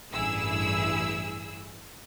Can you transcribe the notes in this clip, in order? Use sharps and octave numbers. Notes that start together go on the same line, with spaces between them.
A1 G2 E4 G#4 E6